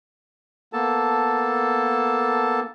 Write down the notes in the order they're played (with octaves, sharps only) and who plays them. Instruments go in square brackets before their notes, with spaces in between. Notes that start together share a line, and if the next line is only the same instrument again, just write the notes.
[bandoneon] A#3 B3 A4 A5